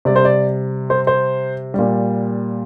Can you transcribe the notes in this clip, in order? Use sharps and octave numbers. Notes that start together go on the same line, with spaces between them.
C3 G3 D5
C5
D5
C5
C5
A#2 G3